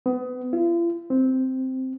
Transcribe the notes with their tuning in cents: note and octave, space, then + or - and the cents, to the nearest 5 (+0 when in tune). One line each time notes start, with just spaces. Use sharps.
B3 +30
F4 -45
C4 -5